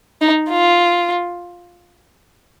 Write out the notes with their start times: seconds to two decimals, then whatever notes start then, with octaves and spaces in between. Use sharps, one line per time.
0.21 D#4
0.50 F4